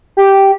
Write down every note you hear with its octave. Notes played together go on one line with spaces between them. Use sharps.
G4